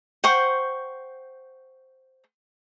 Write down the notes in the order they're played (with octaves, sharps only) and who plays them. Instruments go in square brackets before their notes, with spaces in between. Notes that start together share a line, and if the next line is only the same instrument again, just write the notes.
[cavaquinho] C5 F#5 G5 C#6